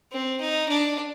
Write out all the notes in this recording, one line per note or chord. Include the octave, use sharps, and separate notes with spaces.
C4
D#4
D4